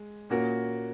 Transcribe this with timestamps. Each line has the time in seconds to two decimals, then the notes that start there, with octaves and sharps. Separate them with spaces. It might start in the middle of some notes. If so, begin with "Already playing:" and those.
Already playing: G#3
0.30 A#2 A#3 C#4 F#4 A#4